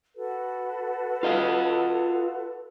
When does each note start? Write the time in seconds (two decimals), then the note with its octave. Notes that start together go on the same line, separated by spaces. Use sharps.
0.16 F#4 A4 B4
1.23 F4 D#5 F5